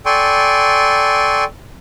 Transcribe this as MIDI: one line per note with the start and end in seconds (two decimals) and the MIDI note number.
0.06 1.44 69
0.06 1.44 74
0.06 1.44 79
0.06 1.44 80
0.06 1.44 84
0.06 1.44 85